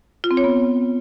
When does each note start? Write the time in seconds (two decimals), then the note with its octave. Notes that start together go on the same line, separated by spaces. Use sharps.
0.24 F4
0.31 C4
0.37 C#5
0.44 B3